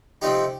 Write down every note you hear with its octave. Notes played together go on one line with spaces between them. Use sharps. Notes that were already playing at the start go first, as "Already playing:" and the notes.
C3 F3 A3 C4 D#4 G4